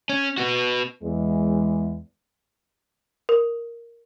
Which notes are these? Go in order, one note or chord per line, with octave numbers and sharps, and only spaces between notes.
C#4
B3 F#4
E2 G#3
A#4